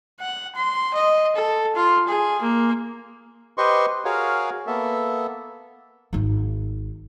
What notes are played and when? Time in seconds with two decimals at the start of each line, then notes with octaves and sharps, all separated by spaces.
0.20 F#5
0.56 C6
0.94 D#5
1.36 A4
1.76 F4
2.08 G#4
2.42 A#3
3.57 G4 B4 C5 D#5 C6 C#6
4.05 F#4 G#4 A#4 C#5 F5
4.67 A#3 B3 A4 E5
6.13 G#1 D#4